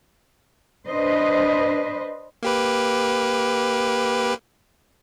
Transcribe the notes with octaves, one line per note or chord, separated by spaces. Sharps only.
D4 B4 C5 D#5
A#3 G4 B4